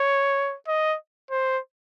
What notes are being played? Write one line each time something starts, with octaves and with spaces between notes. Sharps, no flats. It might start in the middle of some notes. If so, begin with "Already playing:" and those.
Already playing: C#5
D#5
C5